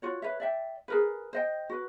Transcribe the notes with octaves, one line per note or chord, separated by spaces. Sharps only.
F4 F#4 C#5
B4 C#5 E5
D5 E5 G5
G#4 A#4 B4
C5 D#5 G5
F#4 B4